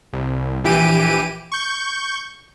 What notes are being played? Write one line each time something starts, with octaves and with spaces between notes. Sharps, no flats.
C2
A#1 E3 G4 D7 D#7
C#6 G6